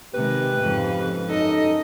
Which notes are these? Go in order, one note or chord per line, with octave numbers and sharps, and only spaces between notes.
C3 D#3 G#3 G4 B4
F2 G#2 C#3
F#2 D#4 A4 D#5